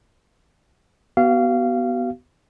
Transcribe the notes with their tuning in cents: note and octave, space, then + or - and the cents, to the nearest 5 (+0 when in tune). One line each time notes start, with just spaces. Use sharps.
B3 +0 F#4 +40 F5 -20